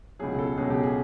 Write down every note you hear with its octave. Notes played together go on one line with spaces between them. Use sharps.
C#2 B2 F#3 G#4
A4
C#2 B2 F#3 G#4
G4
G#4